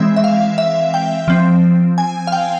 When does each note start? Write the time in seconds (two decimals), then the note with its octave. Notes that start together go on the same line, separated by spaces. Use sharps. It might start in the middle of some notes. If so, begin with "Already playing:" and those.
Already playing: E3 G#3 C4 E5
0.16 E5
0.24 F5
0.58 E5
0.94 G5
1.28 F3 C4
1.98 G#5
2.27 F5
2.32 G5